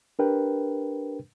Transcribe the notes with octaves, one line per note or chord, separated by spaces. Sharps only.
D4 G4 A#4 B4 G5